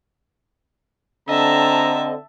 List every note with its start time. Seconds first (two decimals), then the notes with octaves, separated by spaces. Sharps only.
1.29 D3 C4 D#5 E5 A5 A#5